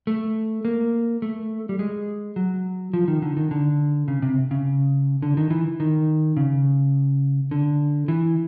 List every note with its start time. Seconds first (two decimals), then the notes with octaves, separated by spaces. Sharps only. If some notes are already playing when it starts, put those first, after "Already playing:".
0.07 A3
0.65 A#3
1.22 A3
1.69 G3
1.79 G#3
2.36 F#3
2.93 F3
3.08 D#3
3.22 D3
3.37 D#3
3.51 D3
4.08 C#3
4.22 C3
4.51 C#3
5.22 D3
5.37 D#3
5.50 E3
5.80 D#3
6.37 C#3
7.51 D3
8.08 E3